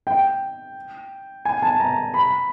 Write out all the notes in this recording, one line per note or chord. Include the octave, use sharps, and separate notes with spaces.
G5
G#5
A5
A#5
B5